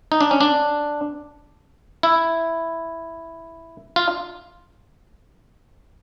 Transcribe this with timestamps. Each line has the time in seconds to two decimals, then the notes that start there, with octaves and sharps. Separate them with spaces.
0.12 D#4
0.21 D4
0.31 C#4
0.41 D4
2.03 E4
3.96 F4